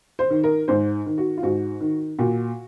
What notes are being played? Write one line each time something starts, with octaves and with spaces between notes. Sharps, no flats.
C5
D#3
A#4
G#2 C5
D#3
F#4
F4
G#2 F#4
D#3
A#2 F#4